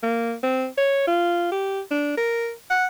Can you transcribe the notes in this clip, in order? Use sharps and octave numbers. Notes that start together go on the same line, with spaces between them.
A#3
C4
C#5
F4
G4
D4
A#4
F#5